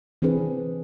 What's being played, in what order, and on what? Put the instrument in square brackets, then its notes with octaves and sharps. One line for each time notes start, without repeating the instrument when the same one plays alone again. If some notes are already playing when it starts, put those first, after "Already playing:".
[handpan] E3 C4 D4 G#4 B4